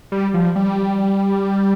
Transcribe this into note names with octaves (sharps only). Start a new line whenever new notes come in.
G3
F3
G3